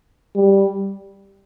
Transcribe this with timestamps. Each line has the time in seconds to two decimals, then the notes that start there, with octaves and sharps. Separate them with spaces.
0.35 G3